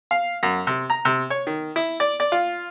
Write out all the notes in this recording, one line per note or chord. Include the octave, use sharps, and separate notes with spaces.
F5
F#2
C3
A#5
C3
C#5
D#3
E4
D5
D5
F4